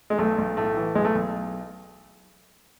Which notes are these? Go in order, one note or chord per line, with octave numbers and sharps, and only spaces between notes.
G#3
B1 A3
B1
A2 A3
E3
B1 G#3
A3
B1